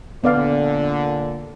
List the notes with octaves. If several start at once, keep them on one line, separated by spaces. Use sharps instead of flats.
A#2 D3 B3 D5 F5